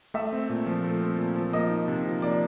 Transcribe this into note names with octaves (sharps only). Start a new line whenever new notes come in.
A3 E5
C4
A#2
F3
A3
C4
A#2
F3
A#3 D#5
D#4
C3
F3
A#3 D5